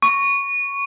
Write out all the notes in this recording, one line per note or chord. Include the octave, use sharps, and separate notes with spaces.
C#6